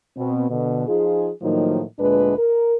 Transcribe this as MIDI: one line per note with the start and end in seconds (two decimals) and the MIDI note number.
0.17 0.46 47
0.17 0.46 60
0.50 0.87 47
0.50 0.87 50
0.88 1.30 53
0.88 1.30 63
0.88 1.30 65
0.88 1.30 68
1.42 1.82 45
1.42 1.82 51
1.42 1.82 53
1.42 1.82 54
1.42 1.82 58
1.42 1.82 63
1.99 2.37 38
1.99 2.37 46
1.99 2.37 56
1.99 2.37 62
1.99 2.37 71
2.38 2.75 70